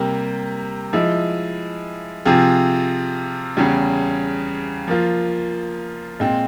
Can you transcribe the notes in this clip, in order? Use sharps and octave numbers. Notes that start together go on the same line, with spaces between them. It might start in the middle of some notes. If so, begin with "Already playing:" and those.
Already playing: C3 G3 A#3
F3 G#3 E4
C3 F3 C4 F4 G#4
E2 C#3 G3 C#4
F3 A#3 F4
A#2 G#3 C4